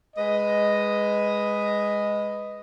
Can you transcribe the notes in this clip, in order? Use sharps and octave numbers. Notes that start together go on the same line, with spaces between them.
G#3 B4 D#5